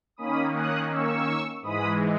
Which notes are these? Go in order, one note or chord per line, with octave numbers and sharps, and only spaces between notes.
D#3 A#3 C#4 B5 D#6
D#6 F#6
C#6 E6
G#2 E3 G#3 B5 D#6